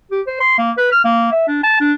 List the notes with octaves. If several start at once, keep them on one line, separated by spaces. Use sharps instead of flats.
G4
C5
C6
A#3
B4
F6
A#3
E5
D4
A5
D4